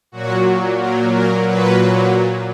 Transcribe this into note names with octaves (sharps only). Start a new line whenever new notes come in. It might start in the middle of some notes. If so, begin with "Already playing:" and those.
A#2 F#3 F#4
A#2 F#3 A#4
A#4
A#2 F#3 B4